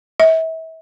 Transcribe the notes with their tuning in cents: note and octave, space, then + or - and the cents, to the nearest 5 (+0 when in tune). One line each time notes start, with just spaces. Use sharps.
E5 -35